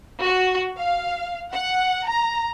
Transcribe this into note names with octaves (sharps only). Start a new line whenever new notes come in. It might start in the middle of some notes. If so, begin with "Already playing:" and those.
F#4
F5
F#5
A#5